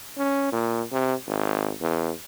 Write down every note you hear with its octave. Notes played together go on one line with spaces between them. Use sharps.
C#4
A#2
C3
G#1
E2